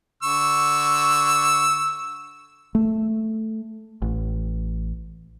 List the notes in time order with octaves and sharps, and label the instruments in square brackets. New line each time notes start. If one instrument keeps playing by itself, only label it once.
[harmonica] D3 C#6 E6
[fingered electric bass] A3
A1